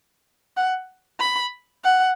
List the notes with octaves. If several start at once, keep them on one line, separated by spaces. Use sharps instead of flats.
F#5
B5
F#5